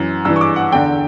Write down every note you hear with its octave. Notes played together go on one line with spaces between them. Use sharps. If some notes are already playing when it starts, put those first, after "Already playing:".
Already playing: F#2 E3
G2 E3 E6
C#6
D6
F#5
E2 D3 G5